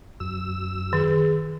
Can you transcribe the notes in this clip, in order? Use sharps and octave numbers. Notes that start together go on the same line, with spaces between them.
F#2 E6
D#3 G#4